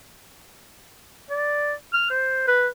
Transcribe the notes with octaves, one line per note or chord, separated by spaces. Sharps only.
D5
F6
C5
B4